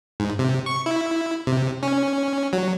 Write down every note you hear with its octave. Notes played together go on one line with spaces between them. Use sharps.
G#2
C3
C#6
E4
C3
C#4
F#3